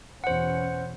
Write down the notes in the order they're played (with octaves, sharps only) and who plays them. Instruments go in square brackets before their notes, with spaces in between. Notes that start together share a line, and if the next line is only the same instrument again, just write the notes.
[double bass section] E2 B2 C#4 [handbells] C5 F#5